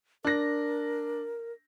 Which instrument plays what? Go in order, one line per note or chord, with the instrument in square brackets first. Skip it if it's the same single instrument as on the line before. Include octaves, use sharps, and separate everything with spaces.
[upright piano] D4 A#6 [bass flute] A#4